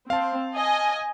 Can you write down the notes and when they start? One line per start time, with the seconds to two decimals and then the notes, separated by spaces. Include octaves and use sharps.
0.10 C4 F5 A5
0.54 D#5 G#5